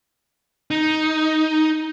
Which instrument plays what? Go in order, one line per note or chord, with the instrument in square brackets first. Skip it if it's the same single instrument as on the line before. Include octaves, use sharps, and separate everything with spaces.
[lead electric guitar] D#4